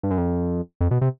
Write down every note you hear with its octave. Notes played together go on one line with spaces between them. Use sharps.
G2
F#2
F2
F2
B2
C3